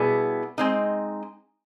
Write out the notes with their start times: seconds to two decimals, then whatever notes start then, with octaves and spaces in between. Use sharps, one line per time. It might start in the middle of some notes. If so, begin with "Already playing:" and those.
Already playing: B2 G3 B3 E4 G#4
0.58 G#3 C4 D#4